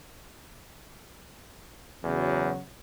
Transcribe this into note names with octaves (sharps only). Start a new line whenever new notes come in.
E2 C#3 F#3